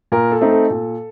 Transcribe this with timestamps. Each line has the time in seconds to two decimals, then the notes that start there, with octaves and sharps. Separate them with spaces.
0.12 A#2 A#4
0.32 A4
0.41 A3 C4 D#4
0.51 A4
0.70 A#2